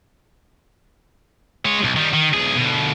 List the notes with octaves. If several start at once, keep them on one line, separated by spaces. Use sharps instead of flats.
G#3 C#5
B1
D#3 G3
D#3
B1 G#4
D2 B2